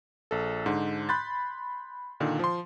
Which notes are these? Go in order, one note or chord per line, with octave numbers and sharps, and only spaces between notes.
A#1 A4
G#2 D3
B5 C6 F#6 G6 A6
A#2 D3 D#3
F3 C6